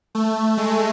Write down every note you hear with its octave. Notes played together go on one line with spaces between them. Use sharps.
A3
G#3